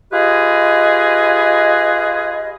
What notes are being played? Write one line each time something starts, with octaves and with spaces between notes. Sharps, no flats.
F4 G4 G#4 B4 D#5